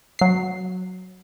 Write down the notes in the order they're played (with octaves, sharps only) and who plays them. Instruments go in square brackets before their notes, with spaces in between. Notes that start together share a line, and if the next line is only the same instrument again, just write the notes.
[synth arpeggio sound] F#3 C7